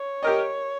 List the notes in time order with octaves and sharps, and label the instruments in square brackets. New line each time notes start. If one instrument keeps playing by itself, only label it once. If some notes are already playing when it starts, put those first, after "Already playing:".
Already playing: [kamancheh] C#5
[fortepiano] G4 A#4 D#5